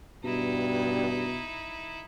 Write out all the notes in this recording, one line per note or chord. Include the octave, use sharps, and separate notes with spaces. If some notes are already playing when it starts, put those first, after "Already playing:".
G2 B2 D#4 E4